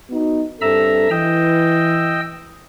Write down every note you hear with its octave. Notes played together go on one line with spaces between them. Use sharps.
B3 D#4 F#4
G2 C4 A4 E5 A#5 E6
E3 D#5 G5 E6